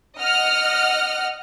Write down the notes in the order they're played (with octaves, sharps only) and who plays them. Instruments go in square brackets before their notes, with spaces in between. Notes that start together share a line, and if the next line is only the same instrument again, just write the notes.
[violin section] D#5 F#5 F6